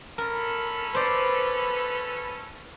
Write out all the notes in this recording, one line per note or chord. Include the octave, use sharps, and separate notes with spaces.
C#4 A4 A#4 B5
B4 C5 D5